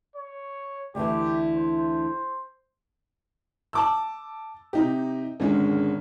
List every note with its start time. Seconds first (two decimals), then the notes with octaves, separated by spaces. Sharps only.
0.16 C#5
0.95 D2 D3 E3 G4
1.56 C5
3.73 A5 D6 E6
4.73 C3 D#4 G4
5.40 G#1 D3 G#3 C#4